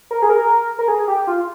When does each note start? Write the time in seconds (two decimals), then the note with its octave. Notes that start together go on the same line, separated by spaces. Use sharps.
0.11 A#4
0.22 G#4
0.30 A#4
0.79 A#4
0.88 G#4
1.08 G4
1.27 F4